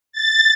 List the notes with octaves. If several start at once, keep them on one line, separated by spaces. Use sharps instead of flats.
A6